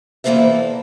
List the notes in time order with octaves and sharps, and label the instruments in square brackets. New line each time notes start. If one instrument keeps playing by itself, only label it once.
[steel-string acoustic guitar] E2 E3 A#3 A4 C5 E5